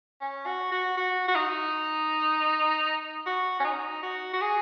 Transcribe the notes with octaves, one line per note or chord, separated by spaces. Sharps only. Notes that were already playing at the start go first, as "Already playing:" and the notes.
C#4
F#4
F#4
F#4
F#4
D#4
F#4
C#4
D#4
F#4
F#4
G#4